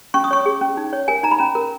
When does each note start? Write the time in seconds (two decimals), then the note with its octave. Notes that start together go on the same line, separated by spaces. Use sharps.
0.14 C#4 C#6
0.24 D#6
0.31 C#5 C#6
0.46 G#4
0.61 C#4
0.77 D#4
0.93 C#5
1.08 A#4 G#5
1.23 D#4 A#5
1.31 B5
1.38 C#4 A#5
1.55 A#4